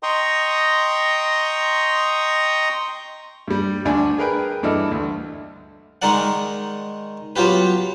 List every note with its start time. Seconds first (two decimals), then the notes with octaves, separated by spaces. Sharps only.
0.03 D#5 G5 A#5 C6 C#6 D#6
3.48 G2 G3
3.85 D2 D4 G#5
4.18 G#4 A#4 B4 G5
4.63 G2 E3 A4 D5 D#5 F6
4.91 D2
6.02 D#3 G#3 D#4 A#4 D5 F#5
7.36 F#3 B3 F4 G4 B4